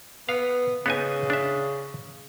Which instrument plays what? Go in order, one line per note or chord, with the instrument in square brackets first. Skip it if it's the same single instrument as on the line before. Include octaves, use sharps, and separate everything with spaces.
[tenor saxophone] B3 [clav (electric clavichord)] F5
[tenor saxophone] C#3 [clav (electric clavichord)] B3 D#4 G#5
[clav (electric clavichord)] D4 E5